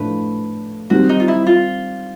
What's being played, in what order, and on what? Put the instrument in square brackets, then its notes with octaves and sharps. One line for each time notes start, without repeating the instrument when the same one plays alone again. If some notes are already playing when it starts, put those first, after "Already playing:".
Already playing: [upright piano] A2 F3 A3 D4 [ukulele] B4
[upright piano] D#3 G3 C4 [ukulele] F#4
[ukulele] D#4
F4
E4
F4